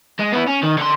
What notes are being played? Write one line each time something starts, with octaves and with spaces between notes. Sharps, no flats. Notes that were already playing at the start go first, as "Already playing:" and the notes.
G#3
B3 E4
C#4
D#3
D3 C6